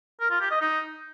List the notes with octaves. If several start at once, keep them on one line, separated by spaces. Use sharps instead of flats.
A#4
F4
G4
D#5
D#4